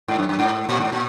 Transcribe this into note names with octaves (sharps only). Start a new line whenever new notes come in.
G#2
F#2
F#2
G#2
A#2
G#2
A#2